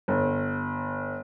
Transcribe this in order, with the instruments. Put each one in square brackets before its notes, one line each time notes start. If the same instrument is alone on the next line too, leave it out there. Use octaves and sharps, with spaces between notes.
[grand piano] G1